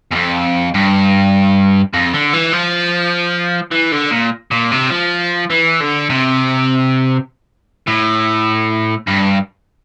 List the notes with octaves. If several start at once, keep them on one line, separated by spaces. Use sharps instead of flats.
E2
F2
G2
F2
D3
E3
F3
E3
D3
A#2
A#2
C3
F3
E3
D3
C3
A2
G2